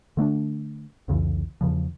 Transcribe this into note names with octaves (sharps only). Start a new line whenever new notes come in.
D3 A3 C4 D4
C2 F2 C#3 E3
E2 C#3 F3